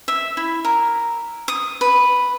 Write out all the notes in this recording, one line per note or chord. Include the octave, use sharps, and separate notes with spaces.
E5
E4
A#4
D#6
B4